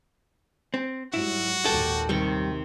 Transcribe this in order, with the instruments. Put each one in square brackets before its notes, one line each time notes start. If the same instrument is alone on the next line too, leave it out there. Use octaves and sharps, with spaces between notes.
[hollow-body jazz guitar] C4
[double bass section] G#2 F#3 G3 [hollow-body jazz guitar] E4 [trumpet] F#4
[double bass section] G#1 D#2 A#2 [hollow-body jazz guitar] A4 [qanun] G5 A5 D6
[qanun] C3 D#3 C#6 [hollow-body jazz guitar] G3